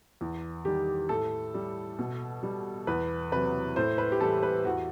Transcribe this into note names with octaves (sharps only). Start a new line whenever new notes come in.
E2
D#3 G3 G4
A2 A4
G3
B2
G3
E2 B4
C3 F#3 B4
A2 C5
B4
G4
E3 G3 A4
B4
E2 F#4